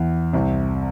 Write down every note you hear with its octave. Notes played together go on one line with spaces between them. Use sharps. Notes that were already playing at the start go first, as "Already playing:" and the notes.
Already playing: E2 E3
C2 C3